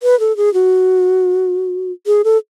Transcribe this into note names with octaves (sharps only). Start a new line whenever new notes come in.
B4
A4
G#4
F#4
G#4
A4